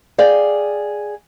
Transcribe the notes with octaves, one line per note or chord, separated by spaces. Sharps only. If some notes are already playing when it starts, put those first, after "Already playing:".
G#4 D5 F5 G5